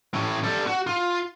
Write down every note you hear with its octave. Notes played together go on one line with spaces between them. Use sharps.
A2 C#4
G3 A4
F#4
F4